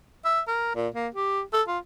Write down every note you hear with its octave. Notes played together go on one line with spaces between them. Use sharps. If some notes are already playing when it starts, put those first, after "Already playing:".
E5
A#4
A#2
A#3
G4
A4
F4